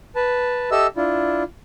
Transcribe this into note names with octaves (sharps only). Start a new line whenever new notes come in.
B4 A5
G4 A4 D#5 E5 E6
D4 E4 F4